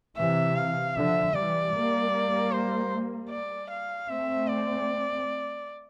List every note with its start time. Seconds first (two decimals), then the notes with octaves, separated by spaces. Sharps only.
0.17 C3 E3 E5
0.56 F5
0.95 D3 F3 E5
1.34 E3 G3 D5
1.73 G3 A#3
2.52 C5
3.30 D5
3.70 F5
4.09 A3 C4 E5
4.48 D5